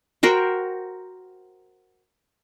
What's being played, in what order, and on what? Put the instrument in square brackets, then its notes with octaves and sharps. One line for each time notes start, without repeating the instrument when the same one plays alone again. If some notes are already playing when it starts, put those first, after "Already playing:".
[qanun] F#4 A#4 C5 G5